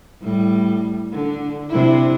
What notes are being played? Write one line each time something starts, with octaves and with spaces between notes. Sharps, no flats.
A2 G3
D3
C3 D4 E4